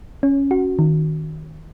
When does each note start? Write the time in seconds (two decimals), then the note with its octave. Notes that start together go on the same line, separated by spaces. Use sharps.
0.23 C#4
0.51 F#4
0.79 D#3